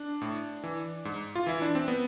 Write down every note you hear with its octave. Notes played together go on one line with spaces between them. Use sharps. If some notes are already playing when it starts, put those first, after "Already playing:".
Already playing: D4
A2
E3
G#2
F4
E3 E4
D4
C4
B3